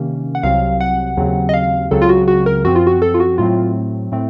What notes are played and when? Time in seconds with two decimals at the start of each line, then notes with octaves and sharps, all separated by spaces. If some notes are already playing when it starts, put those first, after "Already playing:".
Already playing: C3 D#3 A#3 C#4
0.35 F#5
0.43 C2 C3 F#3 C4 F5
0.80 F#5
1.17 D#2 C#3 F#3 C4
1.49 D#5
1.54 F5
1.91 C#2 C#3 F#3 C4 A4
2.02 F4
2.09 F#4
2.28 F#4
2.46 A#4
2.65 F#2 F3 C4 F#4
2.76 F4
2.87 F#4
3.02 A4
3.14 F4
3.20 F#4
3.38 A2 F#3 A3 C4 F4
4.12 A2 A3 C4